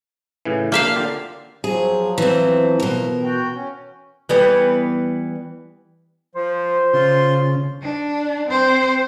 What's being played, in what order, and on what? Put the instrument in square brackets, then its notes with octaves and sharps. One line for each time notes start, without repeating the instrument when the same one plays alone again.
[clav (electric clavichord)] A2 C#3 E3
[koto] A#3 E5 F5 [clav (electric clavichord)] D4 G5
[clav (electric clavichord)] D3 F4 G4
[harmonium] F3 F#3 [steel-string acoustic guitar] G#4
[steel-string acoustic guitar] E3 C4
B2 A#4
[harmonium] F#4 G5
C#4
[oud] E3 G3 B3
[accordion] F3 [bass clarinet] C5
[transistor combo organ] C#3 [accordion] F4 C6
[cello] D4
C4 C5